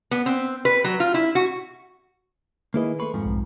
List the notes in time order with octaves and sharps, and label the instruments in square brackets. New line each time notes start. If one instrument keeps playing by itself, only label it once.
[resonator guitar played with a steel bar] B3
C4
B4
F#3
F4
E4
F#4
[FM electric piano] D#3 G#4 B4 [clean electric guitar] A#3 E4 D#5
[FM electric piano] A3 C6 C#6 [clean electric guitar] B4
[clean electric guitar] F2 G#2 F3
[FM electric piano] B1